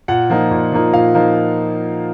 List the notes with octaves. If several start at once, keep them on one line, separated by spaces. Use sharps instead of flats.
A#2 F#5
F3 A#3 D#4
A#2
F3 A#3 D#4
A#2 F5
F3 A#3 D#4